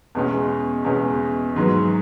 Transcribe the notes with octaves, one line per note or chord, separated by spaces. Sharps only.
E2 B2 G#3 C#4
E2 B2 G#3 C#4
G#2 F#3 B3